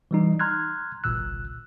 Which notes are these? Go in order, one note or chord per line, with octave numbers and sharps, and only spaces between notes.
E3 G3 D#4
A#5 C6 F6 F#6 G#6
G1 C2 A#2 E6 F#6